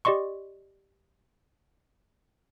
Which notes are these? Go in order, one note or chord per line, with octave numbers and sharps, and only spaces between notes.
G4 D5 D#5 C6 C#6